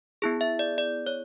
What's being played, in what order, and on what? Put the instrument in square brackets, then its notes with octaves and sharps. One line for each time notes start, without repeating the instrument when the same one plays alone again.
[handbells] B3 E4 G#4
E5
D5
D5
C#5